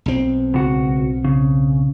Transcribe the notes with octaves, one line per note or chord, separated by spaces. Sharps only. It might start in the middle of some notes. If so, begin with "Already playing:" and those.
B1 C4
C#2 F#4
C#3